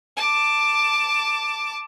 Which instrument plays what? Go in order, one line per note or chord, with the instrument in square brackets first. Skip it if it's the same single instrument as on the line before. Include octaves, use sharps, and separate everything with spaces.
[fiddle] A5 D6